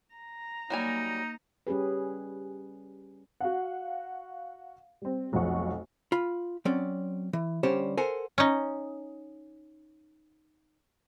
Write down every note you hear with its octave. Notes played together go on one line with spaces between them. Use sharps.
A#5
F#3 G3 A#3 D#4 G#5
G3 C#4 G4 G#4 B4
F#4 F5 F#5
G3 C4
F1 B1 F2 F3 F#5 C#6
F4 B5
F#3 C4 C#4 D5
E3
D3 G3 C#4 G4 C5 C#5
A4 A#4 C5 F#5 G#5
C#4 D#4